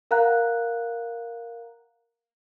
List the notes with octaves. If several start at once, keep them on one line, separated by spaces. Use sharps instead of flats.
A#4 F5 F#5 A#5 F#6